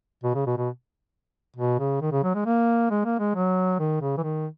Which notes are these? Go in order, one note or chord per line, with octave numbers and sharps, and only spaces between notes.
B2
C#3
B2
B2
B2
C#3
D#3
C#3
F#3
G#3
A#3
G#3
A#3
G#3
F#3
D#3
C#3
E3
D#3